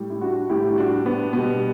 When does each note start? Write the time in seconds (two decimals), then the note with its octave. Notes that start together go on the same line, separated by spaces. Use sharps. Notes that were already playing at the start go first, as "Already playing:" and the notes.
Already playing: A2 G3
0.10 E4
0.21 D4 F#4
0.49 A2 G3 E4 G4
0.77 D4 F#4
1.05 B3 D4
1.33 B2 G3 B3